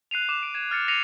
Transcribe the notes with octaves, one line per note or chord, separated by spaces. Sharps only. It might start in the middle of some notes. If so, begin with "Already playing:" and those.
F#6 C7 D#7 F7
D6 E7
D7
G#6 E7
F6 A6 C#7
A#6 C7 C#7 D#7 F7